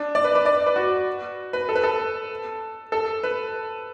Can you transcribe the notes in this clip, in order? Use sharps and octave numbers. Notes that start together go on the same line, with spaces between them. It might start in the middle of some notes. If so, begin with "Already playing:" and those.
Already playing: D4
D5
B4
B4
D5
B4
F#4
B4
A4
B4
A4
A4
B4